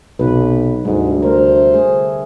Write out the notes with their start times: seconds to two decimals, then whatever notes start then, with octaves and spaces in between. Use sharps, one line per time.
0.19 B1 C3 F#3 B4
0.85 D2 G#2 D3 G3
1.23 A3 A#4 C5
1.74 A3 G#4